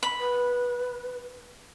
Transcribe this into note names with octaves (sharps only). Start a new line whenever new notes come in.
B5
B4